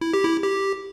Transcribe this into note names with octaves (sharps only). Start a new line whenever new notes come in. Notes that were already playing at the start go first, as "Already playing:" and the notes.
E4
G4
E4
G4